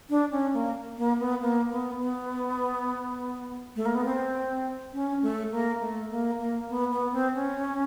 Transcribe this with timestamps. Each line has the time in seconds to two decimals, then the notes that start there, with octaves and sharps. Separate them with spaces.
0.10 D4
0.32 C#4
0.54 A#3
0.98 A#3
1.20 B3
1.41 A#3
1.71 B3
2.00 B3
3.76 A3
3.86 A#3
3.95 B3
4.05 C4
4.93 C#4
5.23 A3
5.52 A#3
5.81 A3
6.10 A#3
6.39 A#3
6.69 B3
6.91 B3
7.12 C4
7.35 C#4